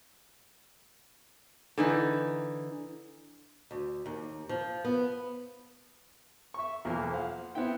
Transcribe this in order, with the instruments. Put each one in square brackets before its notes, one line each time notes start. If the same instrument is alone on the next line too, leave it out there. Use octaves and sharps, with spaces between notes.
[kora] D3 E3 D#4
[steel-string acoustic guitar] D2
D#2
F3
B3
[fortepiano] E5 C#6
B1 E2 F3 A#3
C5 F5 F#5
B3 C4 E4 E5 G5